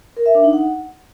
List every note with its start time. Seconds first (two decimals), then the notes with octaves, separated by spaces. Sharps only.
0.17 A#4
0.26 E5
0.35 D4
0.44 D#4
0.53 F#5